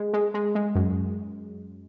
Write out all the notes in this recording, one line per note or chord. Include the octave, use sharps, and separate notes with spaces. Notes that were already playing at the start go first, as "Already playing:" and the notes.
Already playing: G#3
G#3
G#3
G#3
F#2